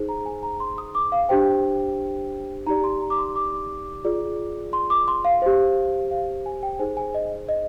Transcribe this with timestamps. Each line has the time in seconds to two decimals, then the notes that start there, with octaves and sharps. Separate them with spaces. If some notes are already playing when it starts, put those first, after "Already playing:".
Already playing: D#4 G#4 C5
0.09 A#5
0.26 G#5
0.43 A#5
0.60 C6
0.78 D#6
0.95 D6
1.12 F5
1.29 D4 G4 C5 G5
2.67 D#4 G4 D5 A#5
2.84 C6
3.01 A#5
3.10 D6
3.18 C6
3.36 D6
4.04 F4 G#4 D5
4.73 C6
4.90 D6
5.08 C6
5.25 F5
5.42 G4 C5
6.11 F5
6.46 G#5
6.63 G5
6.79 D#4 G#4 C5 G#5
6.97 G#5
7.15 D#5
7.49 D#5